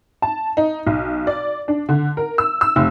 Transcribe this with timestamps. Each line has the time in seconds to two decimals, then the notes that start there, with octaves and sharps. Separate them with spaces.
0.22 A5
0.57 D#4
0.87 B1
1.27 D5
1.68 D4
1.89 D3
2.17 A#4
2.38 E6
2.61 E6
2.76 F1